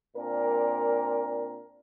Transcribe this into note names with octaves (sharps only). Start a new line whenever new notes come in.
A#2 C4 D4 A#4